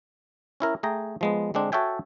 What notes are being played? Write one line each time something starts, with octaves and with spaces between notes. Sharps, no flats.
C#4 E4 A#4
A3 G#4 G5 A#5
F3 G#3 B3
D3 G#3 C4 D4
F#4 A4 C#5 E5 G5 G#5